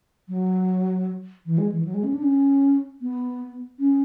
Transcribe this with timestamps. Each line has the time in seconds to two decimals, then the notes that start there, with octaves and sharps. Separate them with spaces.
0.29 F#3
1.46 E3
1.58 G#3
1.72 E3
1.85 F#3
1.94 G#3
2.04 C#4
2.14 D4
2.23 C#4
3.02 B3
3.79 C#4